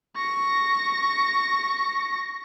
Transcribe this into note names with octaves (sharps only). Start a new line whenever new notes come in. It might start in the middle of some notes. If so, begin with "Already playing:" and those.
C#6 A#6